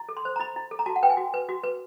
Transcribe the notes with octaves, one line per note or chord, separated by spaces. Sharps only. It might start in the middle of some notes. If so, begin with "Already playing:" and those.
Already playing: E4
A4
C6
C5
A#5
E4 B5
E4
A4
A#5
F#4 A5
F#5
B4 G5
G#5
F#4
B4
F#4
B4